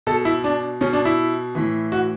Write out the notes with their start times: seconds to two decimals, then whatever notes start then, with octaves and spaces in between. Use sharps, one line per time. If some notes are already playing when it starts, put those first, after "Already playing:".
0.07 B2 A4
0.25 E4
0.44 D4
0.81 B2 C#4
0.93 D4
1.05 E4
1.55 A2 E3
1.92 F#4